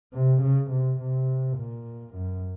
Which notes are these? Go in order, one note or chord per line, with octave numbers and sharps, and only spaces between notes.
C3
C#3
C3
C3
A#2
F#2